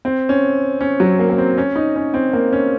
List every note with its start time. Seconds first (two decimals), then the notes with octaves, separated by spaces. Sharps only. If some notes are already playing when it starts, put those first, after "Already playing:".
0.05 C4
0.29 C#4
0.81 C#4
1.00 F#3
1.19 A#3
1.30 A#3
1.38 C4
1.58 C#4
1.76 D#4
1.96 C#4
2.14 C4
2.33 A#3
2.53 C#4